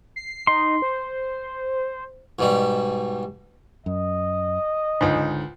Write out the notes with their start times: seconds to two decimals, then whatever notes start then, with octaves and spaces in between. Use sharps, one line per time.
0.16 C7
0.47 D#4 C6
0.82 C5
2.39 G#2 B2 G3
3.86 F#2 D#5
5.01 C#2 G#2 D3